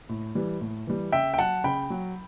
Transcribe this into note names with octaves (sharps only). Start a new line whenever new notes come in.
A2
E3 G3
A2
E3 G3
C#3 E5 G5
G5
F#3 F#5 A5
C#3 G5 B5
F#3